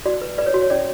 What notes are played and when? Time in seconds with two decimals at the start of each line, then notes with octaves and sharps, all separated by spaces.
0.05 F#4 D5
0.22 B4
0.38 B4 D5
0.46 C#5
0.54 F#4
0.62 C#5
0.70 C#4 D5